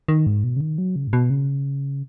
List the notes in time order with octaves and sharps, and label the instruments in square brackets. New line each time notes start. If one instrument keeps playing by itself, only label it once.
[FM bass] D#3
G#2
B2
C#3
D#3
F#3
C#3
G#2
B2
C#3